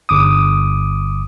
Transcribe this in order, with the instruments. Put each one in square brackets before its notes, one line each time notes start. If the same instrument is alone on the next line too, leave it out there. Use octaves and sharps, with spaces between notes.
[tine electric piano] G1 D6 D#6